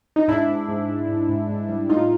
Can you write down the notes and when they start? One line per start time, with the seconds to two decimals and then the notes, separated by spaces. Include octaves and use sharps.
0.16 D#4
0.28 G#2 D4 E4
0.49 G#2
0.68 G#2
0.89 G#2
1.09 G#2
1.29 G#2
1.49 G#2
1.69 G3
1.89 A2 D#4 F4